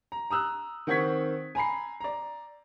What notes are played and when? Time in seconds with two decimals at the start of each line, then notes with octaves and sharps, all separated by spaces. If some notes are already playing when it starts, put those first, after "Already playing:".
0.12 A#5
0.30 A#5 D#6 E6 F#6
0.87 D#3 C4 F#5 C#6 G#6 B6
1.55 G#5 A#5 B5 C7
2.00 D5 A#5